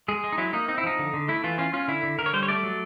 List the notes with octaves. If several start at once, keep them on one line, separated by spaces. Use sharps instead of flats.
G#3 G#4
G#3
D#4
F#3 E4
A#3 D#4
C4 D#4
E4
F3 D#4
D3
D3
A3 E4
E3 F4
C#4 F4
C#4 F4
D3 E4
D3
D3 A#4
C#5
G3 C5
C#5
A3 D5
F#3